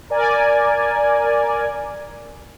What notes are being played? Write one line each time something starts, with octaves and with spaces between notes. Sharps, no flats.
A#4 D5 G#5